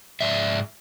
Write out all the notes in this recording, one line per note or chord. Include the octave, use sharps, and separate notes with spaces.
G#2 D5 E5